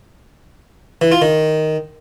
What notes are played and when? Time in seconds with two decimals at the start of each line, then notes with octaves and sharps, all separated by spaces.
1.01 E3
1.12 F4
1.22 D#3